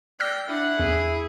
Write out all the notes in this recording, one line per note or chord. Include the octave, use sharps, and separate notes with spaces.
D5 G5 E6 F6 A#6
D4 E4 F#5
E2 G#4